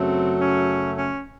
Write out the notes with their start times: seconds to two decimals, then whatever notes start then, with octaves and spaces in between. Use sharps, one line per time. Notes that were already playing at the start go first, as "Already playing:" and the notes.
Already playing: F#2 C#3 F#3 A3 C4
0.41 C#4
0.98 C#4